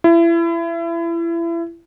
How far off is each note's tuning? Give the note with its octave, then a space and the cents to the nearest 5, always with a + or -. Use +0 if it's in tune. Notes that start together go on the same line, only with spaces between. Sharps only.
E4 +30